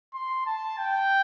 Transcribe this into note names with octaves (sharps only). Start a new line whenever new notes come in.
C6
A5
G5